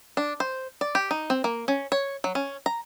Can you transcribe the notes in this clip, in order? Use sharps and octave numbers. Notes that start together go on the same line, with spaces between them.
D4
C5
D5
G4
D#4
C4
A#3
C#4
C#5
F#3
C#4
A#5